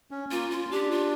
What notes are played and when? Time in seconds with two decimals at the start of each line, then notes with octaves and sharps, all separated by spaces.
0.11 C#4
0.31 A#3 F4
0.51 C#4 F4
0.71 D4 G4
0.91 F4